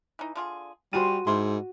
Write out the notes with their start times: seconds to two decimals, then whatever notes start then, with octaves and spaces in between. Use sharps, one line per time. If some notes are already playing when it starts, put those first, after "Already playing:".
0.19 E3 D#4
0.35 D3 F4 G#4
0.93 G3 F4 F#4 G#4 C5 D#7
1.27 G#2 D#3 E4 C6